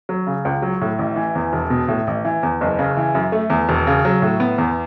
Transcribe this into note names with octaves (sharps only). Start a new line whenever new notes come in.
F#3
C#3
C#2
F#3
A2
A1
E3
E2
E1
B2
A2
A1
E3
E2
F#1
C#3
E3
F#2
A3
E2
E1
C#3
F#3
A2
B3
E2